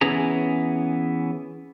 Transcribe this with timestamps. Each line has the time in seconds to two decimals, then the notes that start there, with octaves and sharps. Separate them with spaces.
0.01 E3 B3 C#4 G#4 A#5